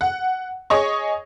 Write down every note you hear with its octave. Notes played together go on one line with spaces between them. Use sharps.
F#5
G#4 C#5 D#5 C#6